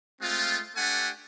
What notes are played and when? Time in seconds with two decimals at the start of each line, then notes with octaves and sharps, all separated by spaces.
0.21 G#3 A3 C4 F4
0.76 A3 D4 G4 A4 F#5 G#5